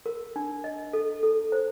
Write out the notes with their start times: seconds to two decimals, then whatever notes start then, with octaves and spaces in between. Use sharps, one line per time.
0.06 A#4
0.36 D4
0.64 D#5
0.93 A4
1.23 A4
1.52 C5